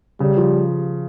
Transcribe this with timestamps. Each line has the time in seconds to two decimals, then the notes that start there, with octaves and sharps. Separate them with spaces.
0.20 C#3 G3
0.37 F3